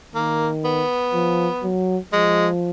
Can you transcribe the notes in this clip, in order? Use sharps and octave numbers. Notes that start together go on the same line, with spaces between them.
D#3 A#3
B3
F3
F#3
F3 G#3